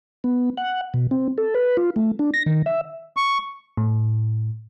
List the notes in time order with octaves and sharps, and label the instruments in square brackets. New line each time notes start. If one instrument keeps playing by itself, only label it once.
[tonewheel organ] B3
F#5
B2
C4
A4
B4
F4
A3
D4
A#6
D#3
E5
[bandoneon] C#6
[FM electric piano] A2